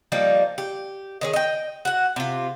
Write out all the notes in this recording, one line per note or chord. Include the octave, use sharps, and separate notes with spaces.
F3 G3 A#3 D#4
G4
D#3 C#4 G#4
D#5 G5
F#4 F#5
C3 F4